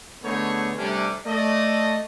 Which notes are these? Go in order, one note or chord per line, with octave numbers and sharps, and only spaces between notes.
D3 A3 B3 D#4 G#4 C#5
C3 G3 A3 C#4 D4
A3 D5 D#5